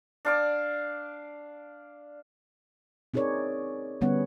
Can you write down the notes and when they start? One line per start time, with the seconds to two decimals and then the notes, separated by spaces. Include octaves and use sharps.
0.25 D4 F5 D6
3.14 C4 D#4 G#4 A#4 C#5 D5
4.01 D3 G3 B3 C#4 C#5 F#5